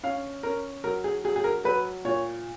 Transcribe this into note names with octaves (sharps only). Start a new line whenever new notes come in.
C#4 F5
C#4 A#4
F#3 A#4
G#4
F#3 G#4
G#4
A#4
F#3 B4
A#2 C#5